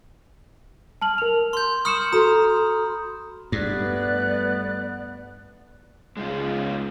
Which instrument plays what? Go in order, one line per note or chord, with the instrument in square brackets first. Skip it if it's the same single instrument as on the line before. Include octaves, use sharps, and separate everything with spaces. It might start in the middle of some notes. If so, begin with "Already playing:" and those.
[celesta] A5 F6 F#7
A#4 F7
[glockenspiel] C6 G6
[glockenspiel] B5 D#6 F6 [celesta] C#6 C#7 E7
[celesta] F#4 A4 C6 [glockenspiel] A#5 D#6
[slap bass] G2 [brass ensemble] G3 A3 B3 [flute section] D5 F#6
[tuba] C#2 [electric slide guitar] G#3 D#4 F4